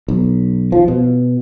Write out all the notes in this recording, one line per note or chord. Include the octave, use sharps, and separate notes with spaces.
B1
F3
B2